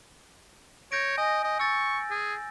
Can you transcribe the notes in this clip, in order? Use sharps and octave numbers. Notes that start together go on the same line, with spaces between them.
C#5 G6 A#6 D7
D#5 G#5
D#5
C#6 E6 A6
G#4